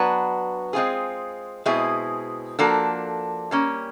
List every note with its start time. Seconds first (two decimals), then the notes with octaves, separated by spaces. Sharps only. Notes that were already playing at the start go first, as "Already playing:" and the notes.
Already playing: F#3 B3 D4 F#4 B4
0.73 G#3 C4 F4 G#4
1.66 B2 G#3 C4 E4 G#4
2.59 F3 A#3 D4 F#4 A4
3.51 G3 A#3 C#4